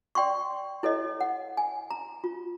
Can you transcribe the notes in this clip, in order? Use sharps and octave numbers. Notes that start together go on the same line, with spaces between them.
D5 G5 C6 C#6
E4 A4 C#5 D#5
F#5
G#5
A#5
F4